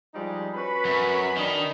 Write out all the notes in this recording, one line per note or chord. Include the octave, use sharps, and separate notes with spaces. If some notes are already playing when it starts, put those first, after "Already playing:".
F3 G3 G#3 D#4
C#4 F#4 B4 B5
F#2
D#3 D4 D#5